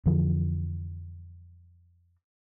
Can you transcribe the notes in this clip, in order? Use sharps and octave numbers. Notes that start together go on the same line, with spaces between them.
F2 D3 E3 F3